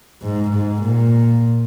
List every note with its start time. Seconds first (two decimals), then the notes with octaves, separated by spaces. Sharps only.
0.22 G#2
0.51 G#2
0.82 A#2